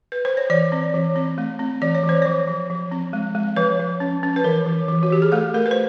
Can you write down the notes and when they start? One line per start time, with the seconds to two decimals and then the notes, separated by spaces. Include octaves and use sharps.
0.12 B4
0.25 C5
0.37 C#5
0.50 E3 D5
0.72 C4
0.94 E3
1.16 C4
1.38 A3
1.59 C4
1.81 E3 D5
1.95 C#5
2.04 E3
2.09 C5
2.22 F3 C#5
2.48 F3
2.70 F3
2.91 C4
3.13 G#3
3.35 G#3
3.56 F3 B4
3.79 F3
4.00 C#4
4.23 C#4
4.36 B4
4.44 E3 A#4
4.67 E3
4.88 E3
5.03 F#4
5.10 E3 G4
5.22 G#4
5.32 A3 A4
5.54 A3 A#4
5.66 B4
5.71 C5